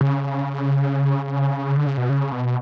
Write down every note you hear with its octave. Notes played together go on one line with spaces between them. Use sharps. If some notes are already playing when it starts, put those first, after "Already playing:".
C#3
D3
C#3
B2
C#3
B2